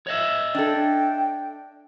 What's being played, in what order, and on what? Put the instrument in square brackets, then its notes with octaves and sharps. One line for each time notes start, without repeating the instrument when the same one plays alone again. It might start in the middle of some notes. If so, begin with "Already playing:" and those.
[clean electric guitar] C#5 D#5 E5
[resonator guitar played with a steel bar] D4 A4 [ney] G5